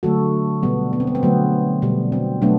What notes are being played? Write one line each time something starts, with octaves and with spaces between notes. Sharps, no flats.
D3 F#3 A3 F#4 A4
B2 G3 B3
B3
C4
B3
C4
D3 F#3 A3 B3
B2 G3
C4
B2 F#3 A3 B3 D4